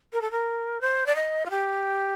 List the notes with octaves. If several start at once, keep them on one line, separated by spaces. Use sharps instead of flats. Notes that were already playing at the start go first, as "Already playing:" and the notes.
A#4
A4
A#4
C5
D5
D#5
F4
G4